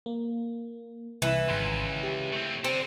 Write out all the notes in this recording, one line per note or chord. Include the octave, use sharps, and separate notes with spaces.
A#3
C2 E3
G#1 C#2 B5 C6
G4
A3 C4
C4 A4 D5